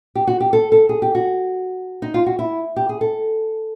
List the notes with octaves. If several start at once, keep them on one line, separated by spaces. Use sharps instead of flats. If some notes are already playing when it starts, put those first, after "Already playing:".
G4
F#4
G4
A4
A4
G#4
G4
F#4
D#4
F4
F#4
E4
G4
G#4
A4